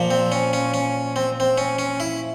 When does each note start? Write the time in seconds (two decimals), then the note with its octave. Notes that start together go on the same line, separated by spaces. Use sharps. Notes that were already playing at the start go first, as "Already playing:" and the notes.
Already playing: A#2 F3
0.11 C4
0.32 C#4
0.53 C#4
0.74 C#4
1.16 C4
1.40 C4
1.58 C#4
1.79 C#4
2.00 E4